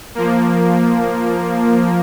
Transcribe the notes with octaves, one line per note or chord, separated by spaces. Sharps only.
F3 A#3